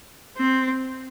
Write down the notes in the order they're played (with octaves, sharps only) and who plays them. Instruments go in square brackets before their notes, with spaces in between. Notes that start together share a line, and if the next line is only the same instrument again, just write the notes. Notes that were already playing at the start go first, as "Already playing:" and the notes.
[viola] C4